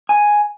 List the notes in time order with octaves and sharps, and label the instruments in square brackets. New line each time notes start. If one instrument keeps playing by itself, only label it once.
[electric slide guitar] G#5